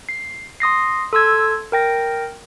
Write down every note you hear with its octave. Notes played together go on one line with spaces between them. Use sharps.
C7
C6 D#6 A#6 C7
A4 C6 E6 G#6
A#4 G5 A#6